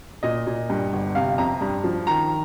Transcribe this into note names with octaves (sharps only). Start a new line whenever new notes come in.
A#2 D#5
A#2
G2
G1
C3 F5
F2 A#5
G2
F3
D#3 A#5